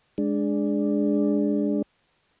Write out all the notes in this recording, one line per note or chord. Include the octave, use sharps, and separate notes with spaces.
G#3 D4